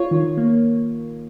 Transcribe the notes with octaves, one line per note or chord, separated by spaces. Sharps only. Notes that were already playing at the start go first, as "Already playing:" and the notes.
Already playing: F4 C#5
D#3
A#3